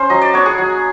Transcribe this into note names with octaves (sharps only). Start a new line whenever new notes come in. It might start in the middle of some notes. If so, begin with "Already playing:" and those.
Already playing: C#4 C5
F#3 D#5
D5
B3 D4 C#5
G#4
F#3